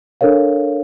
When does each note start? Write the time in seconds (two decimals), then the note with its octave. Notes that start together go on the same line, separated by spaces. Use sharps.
0.21 D4 A4 A#4 C#5 F5